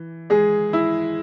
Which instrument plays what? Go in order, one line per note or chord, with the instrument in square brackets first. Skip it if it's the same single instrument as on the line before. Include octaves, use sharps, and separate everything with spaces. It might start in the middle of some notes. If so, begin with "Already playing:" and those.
Already playing: [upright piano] E3
G#3 G#4
E4